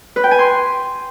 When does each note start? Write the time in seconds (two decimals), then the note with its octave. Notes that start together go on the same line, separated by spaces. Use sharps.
0.16 B4
0.24 G5
0.31 G#5
0.39 C6